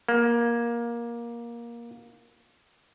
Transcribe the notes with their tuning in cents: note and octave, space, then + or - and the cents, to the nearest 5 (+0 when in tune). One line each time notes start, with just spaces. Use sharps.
A#3 +15